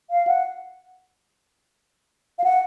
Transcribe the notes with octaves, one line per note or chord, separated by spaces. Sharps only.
F5
F#5
F5
F#5